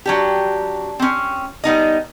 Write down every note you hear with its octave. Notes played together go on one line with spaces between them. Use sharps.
F#3 D4 G4
C4 C#4
G3 B3 D#4 D#5